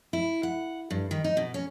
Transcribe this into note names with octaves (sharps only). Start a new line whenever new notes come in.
E4
F#5
G2
D#3
D#4
B2
C#4